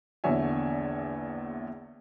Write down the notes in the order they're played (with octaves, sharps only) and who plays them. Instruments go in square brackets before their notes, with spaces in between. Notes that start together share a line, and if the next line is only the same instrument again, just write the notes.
[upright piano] A#1 E2 D3 C#5 E5 G#5